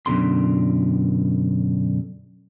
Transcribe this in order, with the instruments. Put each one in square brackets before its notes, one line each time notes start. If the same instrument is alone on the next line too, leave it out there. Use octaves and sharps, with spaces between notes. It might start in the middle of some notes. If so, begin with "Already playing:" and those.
[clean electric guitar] F#2 B2 D3 C6